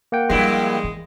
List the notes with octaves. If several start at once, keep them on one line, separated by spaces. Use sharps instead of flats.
A#3 F#5 G5
G2 F3 G3 G#3 E4
E3